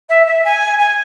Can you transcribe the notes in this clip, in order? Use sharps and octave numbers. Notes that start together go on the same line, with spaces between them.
E5
E5
G#5
G#5